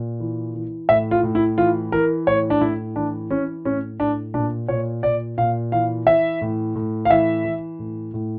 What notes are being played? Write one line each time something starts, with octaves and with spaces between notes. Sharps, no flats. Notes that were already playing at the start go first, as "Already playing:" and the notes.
Already playing: A#2
E3
E3
A2 E5
F4
A2
E4
E3 F4
E3 A#4
A2 C#5
D4
A2 E4
E3 D4
E3 C#4
A2 C#4
A2 D4
A#2 D4
A#2 C#5
A#2 D5
A#2 F5
E3 F5
E3 E5
A2
A2
F5
E3 E5
E3
A2
A2